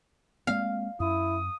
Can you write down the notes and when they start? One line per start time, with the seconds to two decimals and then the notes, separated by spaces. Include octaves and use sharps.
0.47 G#3 A#3 C4 F5
1.00 F#2 E4 D#6